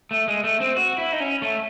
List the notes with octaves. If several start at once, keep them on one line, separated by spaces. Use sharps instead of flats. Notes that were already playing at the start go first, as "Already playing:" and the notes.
A3
G#3
A3
C4
F#4
E4
D#4
C#4
A3